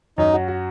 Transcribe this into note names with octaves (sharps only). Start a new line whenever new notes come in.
F#2 D#4
F#4
F#4